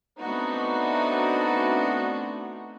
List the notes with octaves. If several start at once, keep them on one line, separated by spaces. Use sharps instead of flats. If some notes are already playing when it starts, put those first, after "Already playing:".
A3 B3 C4 D4 D#4 F#4